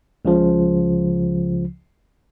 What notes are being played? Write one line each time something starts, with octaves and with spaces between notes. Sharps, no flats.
C#2 C#3 F3